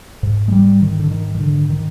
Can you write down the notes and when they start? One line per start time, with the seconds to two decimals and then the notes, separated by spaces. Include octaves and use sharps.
0.23 G#2
0.48 G#3
0.52 G3
0.82 D#3
0.99 D3
1.11 D#3
1.35 D#3
1.40 D3
1.70 D#3